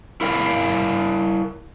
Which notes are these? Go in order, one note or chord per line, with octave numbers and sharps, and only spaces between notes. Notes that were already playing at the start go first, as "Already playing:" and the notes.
E4 A#4 F5 G5